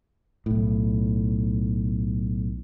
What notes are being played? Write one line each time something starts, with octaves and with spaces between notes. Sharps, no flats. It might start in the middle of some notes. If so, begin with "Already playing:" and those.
B1 A2